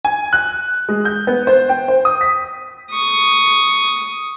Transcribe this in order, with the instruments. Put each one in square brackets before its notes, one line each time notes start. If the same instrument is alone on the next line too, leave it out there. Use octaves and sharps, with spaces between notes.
[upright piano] G#5
F#6
G#3
G6
B3
C5
G5
C5
D#6
B6
[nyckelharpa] C#6 D#6